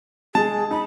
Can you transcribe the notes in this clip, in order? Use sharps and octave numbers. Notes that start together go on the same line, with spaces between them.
G#3 G#4 A5
D#4 B5